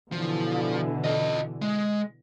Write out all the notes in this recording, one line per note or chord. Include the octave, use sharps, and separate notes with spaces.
B2 D3 E3 F3
F4 D#5
G#3